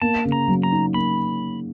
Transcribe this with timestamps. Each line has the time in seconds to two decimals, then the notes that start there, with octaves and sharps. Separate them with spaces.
0.02 A#3 A5
0.25 C#3
0.32 A#5
0.48 F#3
0.63 A#5
0.72 D#4
0.94 A#3 B5